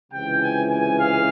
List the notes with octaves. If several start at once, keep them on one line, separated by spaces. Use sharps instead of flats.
C#2 C3 E3 G5
G#5
G#5
F5